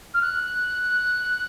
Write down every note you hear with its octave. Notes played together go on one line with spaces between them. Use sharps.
F6
F#6